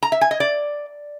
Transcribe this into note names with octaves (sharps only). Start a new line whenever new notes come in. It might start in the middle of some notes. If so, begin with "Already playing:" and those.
A#5
E5
G#5
D#5
D5